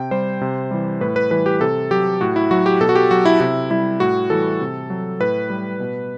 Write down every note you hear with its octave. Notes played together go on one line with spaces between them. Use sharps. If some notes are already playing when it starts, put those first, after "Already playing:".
Already playing: C3 G5
G3 C5
C3
E3 G3
A2 B4
B4
E3 G3 B4
G4
C3 A4
F#3 G4
A2 F#4
E4
F#3 F#4
G4
B2 A4
F#4
G4
F#3 F#4
E4
C3 E4
G3 E4
A2 F#4
E3 G3 A4
C3
F#3
A2 B4
G3
B2